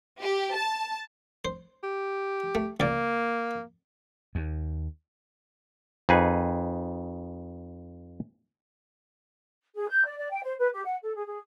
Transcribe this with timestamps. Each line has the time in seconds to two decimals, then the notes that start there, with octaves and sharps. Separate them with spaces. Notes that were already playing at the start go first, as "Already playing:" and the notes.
0.22 G4
0.55 A5
1.45 C5
1.83 G4
2.55 A3
2.80 C#2 A#3 D5
4.35 D#2
6.09 F2 D#4 G#4 B4
9.76 G#4
9.89 G6
10.06 D5
10.18 D5
10.30 G5
10.43 C5
10.59 B4
10.73 G4
10.85 F#5
11.03 A4
11.15 G#4
11.26 G#4